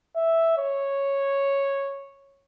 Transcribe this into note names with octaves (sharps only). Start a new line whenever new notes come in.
E5
C#5